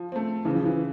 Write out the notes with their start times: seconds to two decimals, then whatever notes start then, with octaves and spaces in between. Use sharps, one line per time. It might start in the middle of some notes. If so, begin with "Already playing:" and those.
Already playing: F3
0.12 A3 C4
0.45 C#3 E3
0.55 F3
0.65 E3